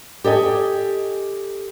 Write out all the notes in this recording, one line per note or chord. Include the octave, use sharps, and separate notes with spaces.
G4 A4 D#5 G#5